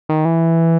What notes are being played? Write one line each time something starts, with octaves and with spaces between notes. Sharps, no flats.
D#3
E3